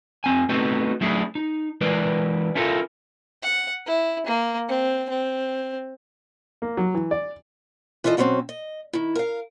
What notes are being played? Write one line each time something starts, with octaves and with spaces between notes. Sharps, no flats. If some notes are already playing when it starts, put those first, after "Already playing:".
F2 C4 G#5
A3 B3 C4 D#4 F#4 A4
F#3 A3 C#4 D4 E4 G#4
D#4
E3 G#3 E4 A#4 B4 D5
C#4 E4 F4 A4 A#4 F5
F#5
E4
A#3
C4
C4
A#3
F#3
E3
D5
E3 E4 F4 A4 D#5
B2 F#3 G3 A#3 C4 C#4
D#5
D#3 E4
A#4 F5